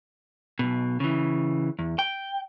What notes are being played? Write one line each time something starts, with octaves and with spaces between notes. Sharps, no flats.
B1 B2
C#3 E3
E2
G5